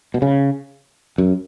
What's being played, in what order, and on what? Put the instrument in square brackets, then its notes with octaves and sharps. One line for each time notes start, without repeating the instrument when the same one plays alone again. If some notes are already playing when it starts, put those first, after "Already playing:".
[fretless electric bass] B2
C#3
F#2